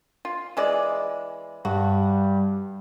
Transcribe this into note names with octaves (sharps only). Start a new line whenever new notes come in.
F4
E3 G#3 D5
G2 F#4